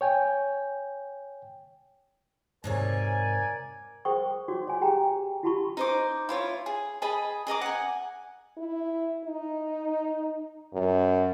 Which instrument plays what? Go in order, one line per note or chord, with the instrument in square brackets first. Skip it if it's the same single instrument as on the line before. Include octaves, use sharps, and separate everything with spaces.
[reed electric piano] C#5 G5 G#5
[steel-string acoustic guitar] G#2 C3 C#5 [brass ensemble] A#4 D5 G#5
[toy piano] G#4 A#4 C5 G5 C#6 D#6
D#4 F#4 C#5 D6
C#5 G#5
G4 G#4 G5 A#5
E4 F#4 G4 A5 B5 C#6
[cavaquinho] D#4 C5 D6
E4 F4 C#5
G#4
G#4 D#5 A5 B5
G#4 D#5 A#5 D6
F#5 G#5
[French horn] E4
D#4
F#2